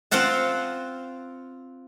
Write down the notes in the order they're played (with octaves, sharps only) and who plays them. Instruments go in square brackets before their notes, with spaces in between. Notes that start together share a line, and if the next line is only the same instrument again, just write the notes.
[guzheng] C4 F4 C5 F5 F#5 A5